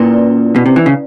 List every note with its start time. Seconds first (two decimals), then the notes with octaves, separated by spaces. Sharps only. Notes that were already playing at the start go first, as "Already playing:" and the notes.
Already playing: A#2 C#4 E4 B4 D5
0.56 B2
0.66 C3
0.76 E3
0.86 C#3